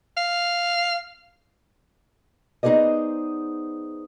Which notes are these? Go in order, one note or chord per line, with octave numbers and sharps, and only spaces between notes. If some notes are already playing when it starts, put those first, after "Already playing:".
F5
B3 D#4 G#4 C5 D5 D#5